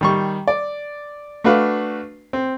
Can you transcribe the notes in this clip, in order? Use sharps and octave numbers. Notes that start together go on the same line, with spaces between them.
D#3 G3 C#6
D5
A3 D4 F#4 B4 F5
C4